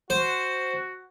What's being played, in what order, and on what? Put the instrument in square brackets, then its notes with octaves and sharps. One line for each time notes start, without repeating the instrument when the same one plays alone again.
[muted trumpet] F#4 [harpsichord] C5